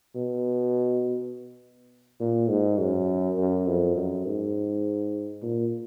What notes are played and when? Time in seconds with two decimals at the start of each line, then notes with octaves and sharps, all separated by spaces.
0.15 B2
2.21 A#2
2.50 G#2
2.79 F#2
3.37 F#2
3.67 F2
3.96 F#2
4.26 G#2
5.42 A#2